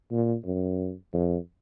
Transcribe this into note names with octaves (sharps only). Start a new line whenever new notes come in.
A#2
F#2
F2